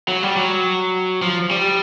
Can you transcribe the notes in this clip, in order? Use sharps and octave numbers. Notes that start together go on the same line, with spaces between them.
F#3
G3
F#3
F3
G3